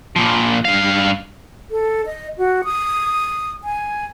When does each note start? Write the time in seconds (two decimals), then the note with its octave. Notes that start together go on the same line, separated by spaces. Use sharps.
0.16 A#2 F3
0.65 G2 F5
1.71 A4
2.06 D#5
2.38 F#4
2.64 D#6
3.64 G#5